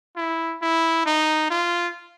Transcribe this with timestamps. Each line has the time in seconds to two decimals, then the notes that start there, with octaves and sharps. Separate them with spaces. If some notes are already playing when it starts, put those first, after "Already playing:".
0.16 E4
0.62 E4
1.05 D#4
1.50 F4